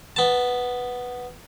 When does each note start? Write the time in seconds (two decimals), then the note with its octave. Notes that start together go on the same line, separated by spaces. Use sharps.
0.16 B3 A5